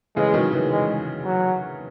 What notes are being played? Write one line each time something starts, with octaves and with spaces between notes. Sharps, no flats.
C#3 E3 G#3
D#3 F#3
C#3 E3
G#3
F#3